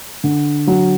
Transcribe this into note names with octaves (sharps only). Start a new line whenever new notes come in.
D3
F#3